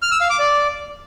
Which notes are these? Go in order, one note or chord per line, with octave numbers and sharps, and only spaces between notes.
F6
E6
F5
D6
D5